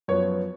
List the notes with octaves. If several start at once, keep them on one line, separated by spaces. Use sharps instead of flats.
F#2 F3 B3 C#5